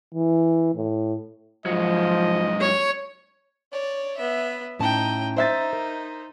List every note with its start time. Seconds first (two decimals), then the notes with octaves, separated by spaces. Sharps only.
0.14 E3
0.75 A2
1.66 G#2 F3 F#3 D#5
2.61 C#5
3.72 C#5 D5
4.17 B3 E5
4.79 A2 C#4 D#4 G5 A5
5.36 D#4 C5 E5 A6
5.73 A#4